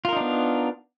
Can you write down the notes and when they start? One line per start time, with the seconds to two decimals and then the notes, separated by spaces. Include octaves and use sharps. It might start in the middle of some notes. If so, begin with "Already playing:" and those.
0.05 F4
0.09 A#4
0.13 D#4
0.17 D4
0.20 B3